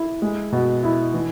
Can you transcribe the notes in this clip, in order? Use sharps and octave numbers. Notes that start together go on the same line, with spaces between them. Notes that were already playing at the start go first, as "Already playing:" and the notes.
Already playing: E4
G#3
B2
E4
E3